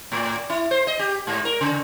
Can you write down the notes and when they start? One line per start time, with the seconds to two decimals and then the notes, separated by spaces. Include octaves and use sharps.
0.12 A2
0.50 E4
0.71 C5
0.87 D#5
0.99 G4
1.27 G#2
1.45 A#4
1.61 C#3